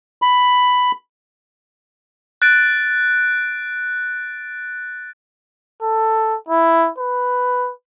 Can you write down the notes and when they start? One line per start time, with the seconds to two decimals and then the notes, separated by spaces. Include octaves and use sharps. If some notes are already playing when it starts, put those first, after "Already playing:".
0.22 B5
2.42 F#6 A6 D7
5.82 A4
6.49 E4
6.99 B4